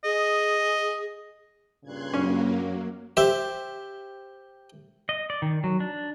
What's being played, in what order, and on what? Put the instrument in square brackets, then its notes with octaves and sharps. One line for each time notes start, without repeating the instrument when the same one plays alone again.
[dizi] G#4 [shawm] D#5
[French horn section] G2 A#2 C#3 [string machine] C6 F#6 G#6
[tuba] F#2 [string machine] F#3 A#3 [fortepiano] C#4
[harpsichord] G4 C5 E5
[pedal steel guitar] D#5
D5
D#3
F#3
D4